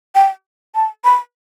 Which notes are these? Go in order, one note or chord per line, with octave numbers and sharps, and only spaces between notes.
G5
A5
B5